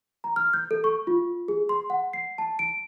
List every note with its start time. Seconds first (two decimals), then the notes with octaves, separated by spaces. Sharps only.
0.24 A#5
0.36 F6
0.53 G6
0.71 A4
0.84 C#6
1.07 F4
1.48 G#4
1.69 C6
1.90 F#5
2.13 C7
2.38 A5
2.59 D7